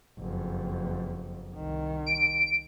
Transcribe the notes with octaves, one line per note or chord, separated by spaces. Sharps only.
F#1 F2
C2 D#3
D7